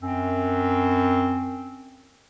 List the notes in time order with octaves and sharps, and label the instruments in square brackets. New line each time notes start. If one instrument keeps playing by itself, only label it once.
[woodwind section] F#2 C4